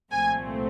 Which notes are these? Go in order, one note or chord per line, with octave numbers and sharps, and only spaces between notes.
C2 A#2 F3 A3 C4 G#5